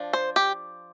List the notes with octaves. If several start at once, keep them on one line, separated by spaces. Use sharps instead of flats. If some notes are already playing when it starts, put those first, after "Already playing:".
Already playing: F3 D4
C5
G4